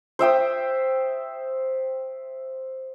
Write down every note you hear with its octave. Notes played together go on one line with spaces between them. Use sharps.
C5 E5 G5 D#6